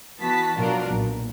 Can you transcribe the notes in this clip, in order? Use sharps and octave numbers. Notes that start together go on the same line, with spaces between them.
E3 B3 F#4 A5 B6
B2 F#3 D4 F4 F#4 A#4
B1 A#2